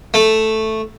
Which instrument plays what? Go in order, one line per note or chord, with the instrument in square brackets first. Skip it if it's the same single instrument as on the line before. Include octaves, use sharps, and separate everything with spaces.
[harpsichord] A3